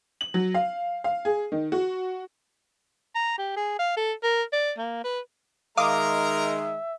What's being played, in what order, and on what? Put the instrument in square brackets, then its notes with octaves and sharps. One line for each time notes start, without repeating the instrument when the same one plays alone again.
[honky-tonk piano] F#7
F#3
F5
F5
G#4
D#3
F#4
[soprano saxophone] A#5
G4
G#4
F5
A4
A#4
D5
A#3
B4
[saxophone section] D#3 G#3 [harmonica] A#4 A#5 [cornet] E5 [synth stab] F5 D6 D#6